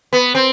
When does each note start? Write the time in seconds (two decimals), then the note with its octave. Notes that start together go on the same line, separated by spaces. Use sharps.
0.13 B3
0.35 C4